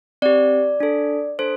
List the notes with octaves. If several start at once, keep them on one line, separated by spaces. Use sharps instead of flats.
C4 G4 D5
D4 A4
D4 A4 C5